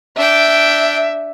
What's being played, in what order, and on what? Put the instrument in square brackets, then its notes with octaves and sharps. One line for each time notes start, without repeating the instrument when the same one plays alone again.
[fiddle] D4 G5 [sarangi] E5